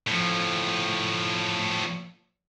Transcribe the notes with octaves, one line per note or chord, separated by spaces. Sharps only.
A2 F3